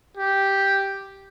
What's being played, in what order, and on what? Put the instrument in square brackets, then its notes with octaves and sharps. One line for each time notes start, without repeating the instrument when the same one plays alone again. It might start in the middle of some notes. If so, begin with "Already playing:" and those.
[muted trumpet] G4